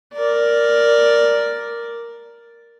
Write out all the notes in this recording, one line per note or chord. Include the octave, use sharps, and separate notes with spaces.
A#4 D5